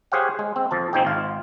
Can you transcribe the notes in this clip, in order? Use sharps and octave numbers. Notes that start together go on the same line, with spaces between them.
G4 G#4 C5 C#5 F5 F#5
G#3
C4
F2 F3 A5
A1 F3 C4 D#4 G#4 G5
G#1 F4